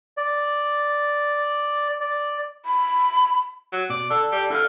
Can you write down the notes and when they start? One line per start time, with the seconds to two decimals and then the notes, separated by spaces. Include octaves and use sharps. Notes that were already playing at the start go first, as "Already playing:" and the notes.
0.17 D5
2.00 D5
2.65 B5
3.72 F#3
3.90 B2 D5
4.10 D3 A4
4.32 G3
4.50 D3 E4 F5